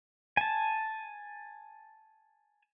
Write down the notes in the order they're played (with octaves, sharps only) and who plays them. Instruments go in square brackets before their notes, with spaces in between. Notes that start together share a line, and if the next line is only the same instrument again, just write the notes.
[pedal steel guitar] G#5 A5